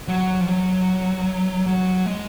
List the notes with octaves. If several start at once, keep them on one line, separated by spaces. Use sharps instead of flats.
F#3
F3
F#3
F#3
G#3